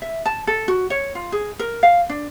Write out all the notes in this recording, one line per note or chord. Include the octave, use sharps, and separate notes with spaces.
E5
A5
A4
F#4
C#5
F4
G#4
A#4
F5
D4